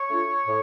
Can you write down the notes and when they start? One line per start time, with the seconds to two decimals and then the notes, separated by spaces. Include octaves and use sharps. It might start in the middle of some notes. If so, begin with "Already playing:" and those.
Already playing: C#5
0.08 A3 D4 F4
0.46 A2